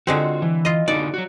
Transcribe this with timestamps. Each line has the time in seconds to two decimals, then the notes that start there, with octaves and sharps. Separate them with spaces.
0.07 D3 G#3 C4 F4 F#4
0.42 E3
0.65 F4 D#5
0.88 D3 D#4 F#4 D5
1.14 F#3 F#4